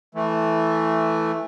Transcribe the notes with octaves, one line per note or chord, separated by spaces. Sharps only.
E3 A3